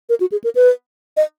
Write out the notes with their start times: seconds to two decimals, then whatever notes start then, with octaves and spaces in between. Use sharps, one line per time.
0.09 A#4
0.20 F#4
0.32 G#4
0.44 A#4
0.55 B4
1.17 D#5